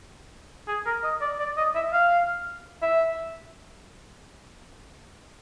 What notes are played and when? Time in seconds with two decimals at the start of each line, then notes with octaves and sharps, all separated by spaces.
0.68 G#4
0.86 A#4
1.04 D#5
1.21 D5
1.39 D5
1.57 D#5
1.75 E5
1.93 F5
2.82 E5